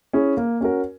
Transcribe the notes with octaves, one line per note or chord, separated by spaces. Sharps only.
C#4 E4 G#4
A#3
C#4 F#4 A#4